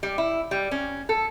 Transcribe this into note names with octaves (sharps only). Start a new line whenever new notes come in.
G3
E4
G3
C#4
A4